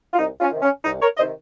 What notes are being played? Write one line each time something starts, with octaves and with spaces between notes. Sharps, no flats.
F4
C2 D#4
C#4 F4
C3 D#3
C#4
C2 D#4
A#4 C#5
C3 D#3 C5 D#5